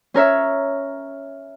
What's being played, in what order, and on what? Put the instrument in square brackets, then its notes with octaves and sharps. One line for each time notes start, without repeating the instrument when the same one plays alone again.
[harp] C#4 A#4 C#5 E5